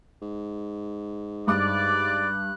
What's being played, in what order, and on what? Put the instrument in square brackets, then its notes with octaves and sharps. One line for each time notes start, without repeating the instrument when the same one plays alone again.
[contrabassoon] G#2
[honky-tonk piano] G2 D6 [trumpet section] D5 [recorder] F#6